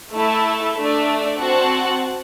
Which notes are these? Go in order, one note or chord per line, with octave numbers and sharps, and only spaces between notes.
A3 E4 A4 E5 A5
A3 D4 A4 D5
C4 F#4 C5 F#5 A5